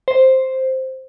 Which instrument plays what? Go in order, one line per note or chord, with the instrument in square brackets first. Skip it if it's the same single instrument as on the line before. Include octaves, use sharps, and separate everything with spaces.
[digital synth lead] C5